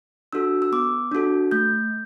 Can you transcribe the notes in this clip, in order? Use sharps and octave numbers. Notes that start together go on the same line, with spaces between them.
D4 F#4 A4 E6
E6
B3 D6
D4 F#4 A4
A3 G6